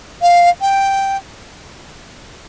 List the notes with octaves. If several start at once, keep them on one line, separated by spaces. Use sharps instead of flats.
F5
G5